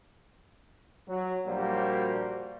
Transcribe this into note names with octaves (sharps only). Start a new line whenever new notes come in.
F#3
A#1 G3 A#3 F#4 C5